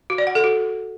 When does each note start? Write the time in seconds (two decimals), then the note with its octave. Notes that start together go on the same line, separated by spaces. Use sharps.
0.10 F#4
0.18 D5
0.27 F#5
0.35 A4
0.44 F#4